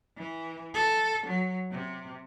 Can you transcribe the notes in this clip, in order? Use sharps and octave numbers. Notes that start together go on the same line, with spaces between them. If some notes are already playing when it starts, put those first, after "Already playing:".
E3
A4
F#3
C3